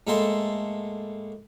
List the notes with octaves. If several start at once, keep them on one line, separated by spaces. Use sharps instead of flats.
A2 G#3 A#3 A4 C6